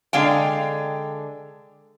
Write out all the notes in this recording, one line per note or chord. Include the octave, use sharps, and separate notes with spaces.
D3 G#3 F5 G5